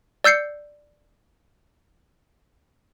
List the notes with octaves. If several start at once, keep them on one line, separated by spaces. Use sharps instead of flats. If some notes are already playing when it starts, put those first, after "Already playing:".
D5 E6 G6 C7 C#7